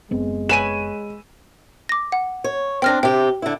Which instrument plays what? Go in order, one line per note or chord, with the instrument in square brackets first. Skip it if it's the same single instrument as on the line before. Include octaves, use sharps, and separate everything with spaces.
[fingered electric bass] F#1 B3 C4 [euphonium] G#3
[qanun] B4 C#5 G#5 [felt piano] D#7 E7
[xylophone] D6 A#6
F#5
[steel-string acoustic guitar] C#5
[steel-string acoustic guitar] C4 D4 [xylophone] G5 F6 A#6
[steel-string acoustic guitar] C3 G4 [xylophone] G5
[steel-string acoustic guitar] D3 E4